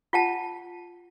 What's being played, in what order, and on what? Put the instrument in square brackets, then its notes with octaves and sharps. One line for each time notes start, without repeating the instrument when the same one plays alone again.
[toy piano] F4 F#5 A5